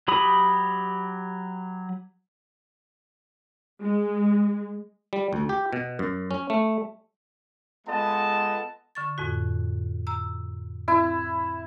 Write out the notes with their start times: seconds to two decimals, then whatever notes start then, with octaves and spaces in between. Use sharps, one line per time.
0.08 F#3 G4 B5 D#6
3.82 G#3
5.13 G3
5.33 D2
5.49 G4
5.73 B2
5.99 F#2
6.31 C#4
6.50 A3
7.87 G#3 B3 F4 A4 D#5 A5
8.95 D3 C#6 A6
9.18 F2 A2 F#4
10.07 A#5 E6
10.88 C4 E4